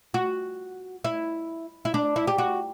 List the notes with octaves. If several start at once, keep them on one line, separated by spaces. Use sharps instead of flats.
F#4
E4
E4
D4
E4
G4
F#4